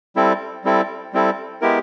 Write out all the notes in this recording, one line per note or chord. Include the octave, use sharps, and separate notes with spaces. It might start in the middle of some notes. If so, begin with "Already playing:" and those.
G3 C4 E4 A4
G3 C4 E4 A4
G3 C4 E4 A4
G#3 B3 E4 G4 A#4